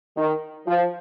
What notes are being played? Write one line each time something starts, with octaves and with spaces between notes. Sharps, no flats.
D#3
F3